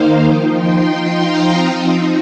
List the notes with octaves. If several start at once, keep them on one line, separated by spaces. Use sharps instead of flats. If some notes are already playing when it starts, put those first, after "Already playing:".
Already playing: D#3 A#3 D#4 C5 F5
F3 D#4 D#5 G5
G5 C6
G5 C6
F5 A#5
F3 C4 D#4 D#5 G5